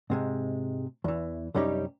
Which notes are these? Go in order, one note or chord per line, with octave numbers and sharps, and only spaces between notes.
G#2 C3 G#3
E2 E3
C2 F#2 G3 C#4 D#4 G4